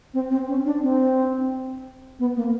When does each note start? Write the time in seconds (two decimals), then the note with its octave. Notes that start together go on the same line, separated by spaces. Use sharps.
0.14 C4
0.31 C4
0.48 C#4
0.65 D4
0.82 C4
2.19 B3
2.36 A#3